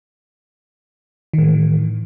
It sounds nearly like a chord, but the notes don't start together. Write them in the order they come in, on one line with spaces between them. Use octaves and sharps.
D#3 A2 E3